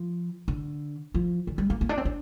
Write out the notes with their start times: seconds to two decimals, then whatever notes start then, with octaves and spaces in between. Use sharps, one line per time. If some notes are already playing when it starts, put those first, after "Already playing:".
Already playing: F3
0.48 D3
1.14 F3
1.47 D3
1.58 G3
1.70 A#3
1.81 A#3
1.89 D4
1.97 C4
2.05 D4